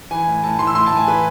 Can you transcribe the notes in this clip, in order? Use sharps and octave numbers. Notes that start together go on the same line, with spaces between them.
E3 G#5
A2
A2 A5
E3 C6
E6
A2 C6
A5
A2 G#5
E3 B4